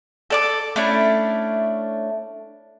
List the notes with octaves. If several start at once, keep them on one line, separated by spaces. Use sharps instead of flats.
A4 D5 D6
A3 C#4 D4 E4